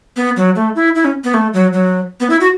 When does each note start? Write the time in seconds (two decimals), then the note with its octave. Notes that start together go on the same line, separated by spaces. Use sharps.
0.16 B3
0.37 F#3
0.56 A3
0.76 E4
0.95 E4
1.05 C#4
1.24 B3
1.34 A3
1.53 F#3
1.73 F#3
2.20 B3
2.30 E4
2.41 F#4